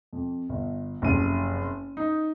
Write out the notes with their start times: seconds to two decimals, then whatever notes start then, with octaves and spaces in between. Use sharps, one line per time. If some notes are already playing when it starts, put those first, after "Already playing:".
0.13 F2
0.49 G1
1.02 F#1 F2 C3 D#7
1.97 D#4